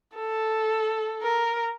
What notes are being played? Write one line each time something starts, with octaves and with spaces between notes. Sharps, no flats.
A4
A#4